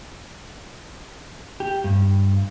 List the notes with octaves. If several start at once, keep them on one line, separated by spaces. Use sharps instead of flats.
G4
G2